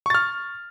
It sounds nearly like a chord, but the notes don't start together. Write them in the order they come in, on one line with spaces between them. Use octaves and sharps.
C#6 A6 F6